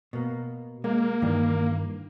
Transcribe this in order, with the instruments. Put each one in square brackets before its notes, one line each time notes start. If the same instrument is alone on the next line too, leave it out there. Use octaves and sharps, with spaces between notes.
[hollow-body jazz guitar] B2 A#3
[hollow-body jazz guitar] G#3 [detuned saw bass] A#3
[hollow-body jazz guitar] G2 D#3 E3